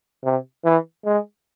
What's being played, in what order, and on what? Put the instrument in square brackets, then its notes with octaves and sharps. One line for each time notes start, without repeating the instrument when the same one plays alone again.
[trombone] C3
E3
G#3